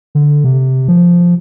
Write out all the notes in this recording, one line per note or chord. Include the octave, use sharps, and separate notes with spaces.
D3
C3
F3